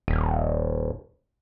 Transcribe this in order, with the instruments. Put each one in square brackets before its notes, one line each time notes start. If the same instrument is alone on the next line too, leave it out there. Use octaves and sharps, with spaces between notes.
[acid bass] D#1